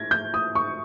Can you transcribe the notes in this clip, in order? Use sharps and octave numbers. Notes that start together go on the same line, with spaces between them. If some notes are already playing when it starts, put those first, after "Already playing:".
Already playing: G#6 A#6
G6
D#6
C#6